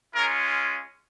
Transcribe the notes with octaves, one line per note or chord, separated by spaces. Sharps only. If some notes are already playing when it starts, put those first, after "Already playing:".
G#3 C#4 F4 A#4